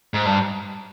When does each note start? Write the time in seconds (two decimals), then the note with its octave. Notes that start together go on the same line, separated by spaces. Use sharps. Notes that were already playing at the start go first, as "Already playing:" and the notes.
0.14 G#2
0.26 G2